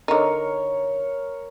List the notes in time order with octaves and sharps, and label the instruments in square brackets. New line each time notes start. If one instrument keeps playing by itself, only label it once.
[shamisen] D3 D#4 [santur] A#4 C#5